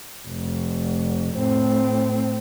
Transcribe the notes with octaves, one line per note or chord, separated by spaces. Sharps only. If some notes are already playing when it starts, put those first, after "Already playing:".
F1
A2 C4